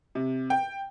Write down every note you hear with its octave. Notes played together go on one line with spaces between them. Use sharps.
C3
G5